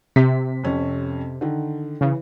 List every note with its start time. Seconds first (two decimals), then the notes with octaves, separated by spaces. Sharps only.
0.16 C3 B6
0.64 F2 C#4
1.41 D3 D#3
2.01 C#3 E3